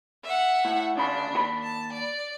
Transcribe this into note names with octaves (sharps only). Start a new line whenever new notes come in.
E5 F#5
A2
D2 C#3 D4 B5
D#2 F#4 B5
A5
D5